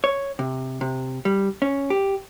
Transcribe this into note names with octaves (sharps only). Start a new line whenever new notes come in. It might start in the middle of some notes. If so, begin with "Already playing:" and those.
C#5
C3
C3
G3
C#4
G4